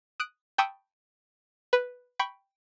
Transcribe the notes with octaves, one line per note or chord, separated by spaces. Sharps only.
D#6 F#6 D7
G5 A5 B5 C#6 D#6 E6
B4
G5 B5 C#6